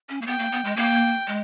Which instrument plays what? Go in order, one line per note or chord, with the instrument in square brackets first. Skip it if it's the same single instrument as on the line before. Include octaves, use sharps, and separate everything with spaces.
[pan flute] C#4
A#3
[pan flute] B3 [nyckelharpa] G5
[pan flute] A#3
B3
G#3
[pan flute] A#3 [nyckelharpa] G5
[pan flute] G#3